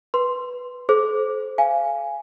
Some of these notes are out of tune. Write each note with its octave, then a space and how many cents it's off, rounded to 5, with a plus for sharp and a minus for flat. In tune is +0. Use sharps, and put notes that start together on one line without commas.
B4 +0 C6 +0
A4 -40 C5 +0 D6 +0
F5 -25 G#5 +0